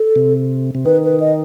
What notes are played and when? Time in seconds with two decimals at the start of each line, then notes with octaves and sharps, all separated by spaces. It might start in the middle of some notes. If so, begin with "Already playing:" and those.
Already playing: A4
0.16 C3
0.75 C3
0.85 D#3 B4
1.04 B4
1.20 D#5